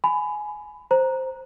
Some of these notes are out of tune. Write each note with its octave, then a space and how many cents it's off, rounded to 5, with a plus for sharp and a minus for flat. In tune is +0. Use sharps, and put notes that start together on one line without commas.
G#5 +15 B5 +20
C5 +0 A#5 +5